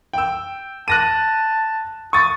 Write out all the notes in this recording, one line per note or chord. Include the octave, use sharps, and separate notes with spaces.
G5 E6
A5 F#6 A#6 D#7
C#6 D#6 A6